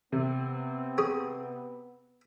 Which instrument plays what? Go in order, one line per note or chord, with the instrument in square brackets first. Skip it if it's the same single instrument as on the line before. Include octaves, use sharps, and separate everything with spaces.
[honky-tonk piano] C3 [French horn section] B3 [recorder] C4
[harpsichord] C#4 G#4